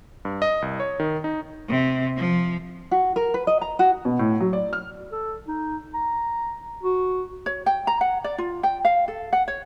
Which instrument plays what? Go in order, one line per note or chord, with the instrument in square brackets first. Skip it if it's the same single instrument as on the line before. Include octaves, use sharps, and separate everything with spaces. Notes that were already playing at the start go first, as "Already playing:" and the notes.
[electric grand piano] G2
D#5
C2
C#5
D#3
D#4
[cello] C3
F3
[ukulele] F#4
A#4
B4
D#5
A#5
F#4
[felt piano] B2
A2
F#3
D5
F6
[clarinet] A4
D#4
A#5
F#4
[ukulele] C#5
G5
A#5
F#5
D5
F4
G5
F5
A4
F#5
C#5